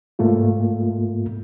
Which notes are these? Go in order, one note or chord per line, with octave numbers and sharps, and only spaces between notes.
G#2 A3 A#3 F4